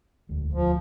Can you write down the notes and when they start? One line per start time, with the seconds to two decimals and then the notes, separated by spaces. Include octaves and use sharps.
0.29 E1 D2
0.53 F3